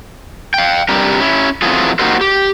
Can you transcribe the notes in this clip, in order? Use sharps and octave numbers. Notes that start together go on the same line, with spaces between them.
F5 G5
G2 C3 G3 G4 A#4
C#4 E4
E3 F#3 A3 C4 F4 G#4
A#3 D#4 F#4 G4 A#4 C5
G4